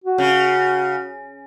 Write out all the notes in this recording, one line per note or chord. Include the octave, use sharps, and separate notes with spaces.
F#4
C#3